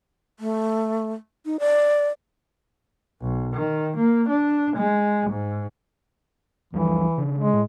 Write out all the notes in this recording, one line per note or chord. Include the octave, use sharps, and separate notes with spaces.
A3
D#4
D5
B1
D#3
A#3
D4
G#3
G#2
D2 E3 F3 G3
C#3 D4
G#3
A2